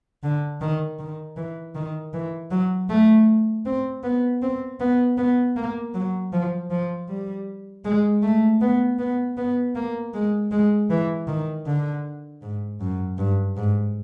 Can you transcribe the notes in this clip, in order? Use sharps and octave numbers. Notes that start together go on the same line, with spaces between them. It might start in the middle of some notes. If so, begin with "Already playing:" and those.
D3
D#3
D#3
E3
D#3
E3
F#3
A3
C4
B3
C4
B3
B3
A#3
F#3
F3
F3
G3
G#3
A3
B3
B3
B3
A#3
G#3
G#3
E3
D#3
D3
G#2
F#2
G2
G#2